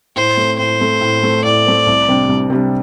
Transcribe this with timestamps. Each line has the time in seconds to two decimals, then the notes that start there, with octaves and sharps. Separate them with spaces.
0.16 A2 C5
0.37 A3 C4
0.59 A2 C5
0.80 A3 C4
1.01 A2
1.23 A3 C4
1.45 A2 D5
1.66 A3 C4
1.87 C2
2.09 C3 G3 D4
2.29 C2
2.50 C3 G3 D4